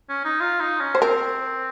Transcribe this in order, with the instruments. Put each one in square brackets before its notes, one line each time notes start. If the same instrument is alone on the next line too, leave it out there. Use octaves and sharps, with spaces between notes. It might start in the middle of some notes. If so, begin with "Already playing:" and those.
[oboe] C#4
D#4
F4
D#4
C#4
[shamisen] C5
[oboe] C4 [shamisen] A#4